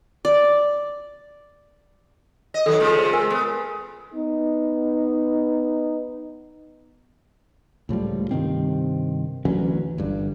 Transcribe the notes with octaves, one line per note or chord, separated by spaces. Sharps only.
D5
D#5
D#3 F#3 A4
C#3 G#3 F4
C5
A#4 G#5
B3
B3 D#4
C#2 A2 F3 G3
G2 C3 D#3 C4
D2 E3 F#3 C#4
G1 G2